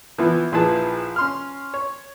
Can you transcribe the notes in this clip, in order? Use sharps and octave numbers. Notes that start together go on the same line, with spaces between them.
E3 F3 B3
A#1 F3 E4 G#4 B4 A5
C#4 C6 F6
C#5